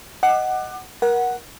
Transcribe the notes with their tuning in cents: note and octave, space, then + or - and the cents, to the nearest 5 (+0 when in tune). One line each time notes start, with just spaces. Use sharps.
D#5 +0 F#5 +15 D6 +30
A#4 +25 F#5 +0